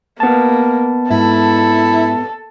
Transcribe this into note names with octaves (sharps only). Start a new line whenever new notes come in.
A#3 B3 A5
G#2 E4 A4